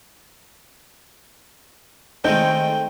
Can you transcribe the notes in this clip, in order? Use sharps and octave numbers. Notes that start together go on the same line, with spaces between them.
D#3 G#3 A3 C4 D#4 A4 G5 G6